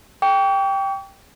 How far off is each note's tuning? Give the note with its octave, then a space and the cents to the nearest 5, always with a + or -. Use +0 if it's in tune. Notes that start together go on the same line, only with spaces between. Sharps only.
G5 +0 C#6 +45